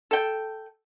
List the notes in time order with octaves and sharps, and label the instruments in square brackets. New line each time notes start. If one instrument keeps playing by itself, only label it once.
[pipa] A4 G5